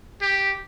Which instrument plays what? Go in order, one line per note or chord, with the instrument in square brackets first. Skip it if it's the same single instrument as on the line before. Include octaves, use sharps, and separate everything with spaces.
[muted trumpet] G4